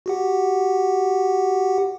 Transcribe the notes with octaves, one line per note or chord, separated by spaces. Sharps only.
F#4 G4 F#5